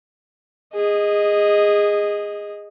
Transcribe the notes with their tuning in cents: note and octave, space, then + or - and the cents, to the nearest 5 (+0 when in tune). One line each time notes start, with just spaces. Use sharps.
G#4 -20 D#5 +0